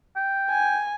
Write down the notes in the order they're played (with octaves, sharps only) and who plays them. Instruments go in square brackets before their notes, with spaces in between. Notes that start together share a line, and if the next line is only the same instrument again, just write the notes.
[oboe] G5
[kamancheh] G#5